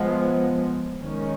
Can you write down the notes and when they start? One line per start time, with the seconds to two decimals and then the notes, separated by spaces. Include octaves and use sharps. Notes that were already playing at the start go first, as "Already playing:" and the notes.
Already playing: F3 G#3 B3
1.02 D#3 G#3 C#4